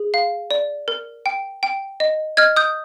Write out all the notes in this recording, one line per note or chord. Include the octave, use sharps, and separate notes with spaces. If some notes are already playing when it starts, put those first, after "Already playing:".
Already playing: G#4
F5
D5
A#4
G5
G5
D#5
D#5 F6 G#6
D#6 G6